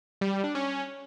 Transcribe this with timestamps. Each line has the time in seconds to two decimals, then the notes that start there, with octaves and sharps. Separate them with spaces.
0.21 G3
0.33 G3
0.44 D4
0.55 C#4